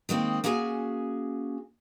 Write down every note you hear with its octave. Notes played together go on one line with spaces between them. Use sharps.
D#3 G#3 A#3 C4
A#3 C#4 F#4 G#4 G5 G#5